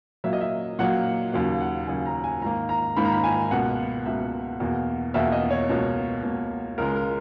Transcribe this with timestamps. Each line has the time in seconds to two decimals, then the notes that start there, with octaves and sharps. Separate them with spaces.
0.24 A#2 F#3 A#3 E5
0.33 D#5
0.41 E5
0.79 A#2 F#3 A#3 F#5
1.33 D#2 C#3 F#3 A#3
1.61 F#5
1.87 D#2 C#3 F#3 A#3 G#5
2.06 A#5
2.24 G#5
2.42 G#2 D#3 A#3 A#5
2.69 A#5
2.96 G#2 D#3 A#3 B5
3.05 A#5
3.12 B5
3.24 G#5
3.51 C#2 B2 A#3 F#5
4.05 C#2 B2 A#3 E5
4.60 E2 B2 A#3
5.14 E2 B2 A#3 E5
5.32 D#5
5.51 C#5
5.69 C#2 B2 A#3
6.23 C#2 B2 A#3
6.78 C#2 C#3 G#3 A#4
6.96 A#4